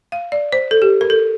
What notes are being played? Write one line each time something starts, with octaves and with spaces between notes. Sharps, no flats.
F5
D5
C5
A4
G4
A#4
A4